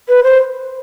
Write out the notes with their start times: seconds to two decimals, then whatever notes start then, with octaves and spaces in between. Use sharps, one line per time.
0.08 B4
0.23 C5